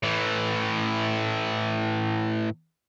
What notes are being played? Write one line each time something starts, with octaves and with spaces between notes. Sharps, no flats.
A2 E3